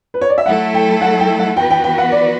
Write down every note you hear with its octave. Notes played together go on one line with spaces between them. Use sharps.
B4
C#5
D5
E5
F#3 A3 E4 A4 F#5
G5
F#5
G5
F#5
E3 B3 F#4 B4 G5
G5
G5
F#5
D5